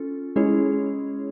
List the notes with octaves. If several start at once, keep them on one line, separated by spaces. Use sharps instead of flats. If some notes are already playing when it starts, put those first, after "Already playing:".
Already playing: C#4 F4 A4
G#3 C#4 E4 G#4 C#5